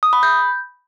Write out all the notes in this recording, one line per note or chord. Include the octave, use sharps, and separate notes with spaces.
D#6
B5
G6